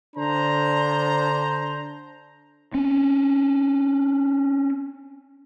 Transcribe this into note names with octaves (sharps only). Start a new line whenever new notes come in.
D3 D4 C5 A#5
C4 C#4